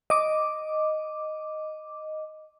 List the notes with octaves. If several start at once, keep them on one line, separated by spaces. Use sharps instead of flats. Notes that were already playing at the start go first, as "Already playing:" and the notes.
D#5 D6